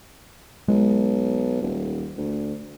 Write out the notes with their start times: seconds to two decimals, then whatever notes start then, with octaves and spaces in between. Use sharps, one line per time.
0.68 B1 G#3
1.62 D#1
2.17 D2